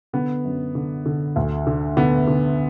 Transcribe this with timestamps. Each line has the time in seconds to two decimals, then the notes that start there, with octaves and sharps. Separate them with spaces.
0.13 D3 B3
0.44 F#2
0.75 D3
1.06 D3
1.36 D2
1.67 D3
1.97 D3 B3
2.27 D3